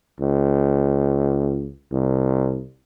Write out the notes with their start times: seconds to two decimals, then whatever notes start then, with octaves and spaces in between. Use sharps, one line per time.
0.20 C#2
1.92 C2